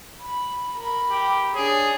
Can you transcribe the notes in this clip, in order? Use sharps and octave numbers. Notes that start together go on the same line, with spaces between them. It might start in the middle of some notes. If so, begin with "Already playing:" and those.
B5
A#4 B5
G4
D4 G#4 C#5